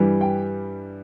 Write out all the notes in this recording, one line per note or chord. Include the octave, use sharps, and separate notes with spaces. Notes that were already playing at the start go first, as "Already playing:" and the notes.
Already playing: G2 E3 G3
G5